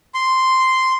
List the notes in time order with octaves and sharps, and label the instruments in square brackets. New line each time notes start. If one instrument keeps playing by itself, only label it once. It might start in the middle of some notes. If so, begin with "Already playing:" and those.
[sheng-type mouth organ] C6